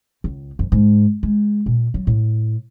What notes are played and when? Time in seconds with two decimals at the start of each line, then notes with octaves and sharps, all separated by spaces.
0.24 C#2
0.59 F2
0.72 G#2
1.23 G#3
1.66 A#2
1.94 F#3
2.07 A2